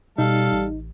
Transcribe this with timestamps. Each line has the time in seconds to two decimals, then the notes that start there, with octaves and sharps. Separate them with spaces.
0.18 B2 G3 D#4 A4 F5
0.52 A1